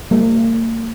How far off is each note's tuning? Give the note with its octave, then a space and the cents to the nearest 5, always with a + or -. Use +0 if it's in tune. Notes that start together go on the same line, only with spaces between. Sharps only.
G3 +30 A#3 -40